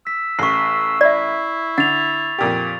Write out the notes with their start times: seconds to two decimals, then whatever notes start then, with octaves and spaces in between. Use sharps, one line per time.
0.07 E6 B6
0.39 A1 C#6 C7
1.01 E4 D5 E5
1.78 D3 F#5 A6 F7
2.38 F2 A#2 G4